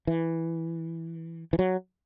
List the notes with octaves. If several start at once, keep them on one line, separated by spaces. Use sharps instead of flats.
E3
E3
F#3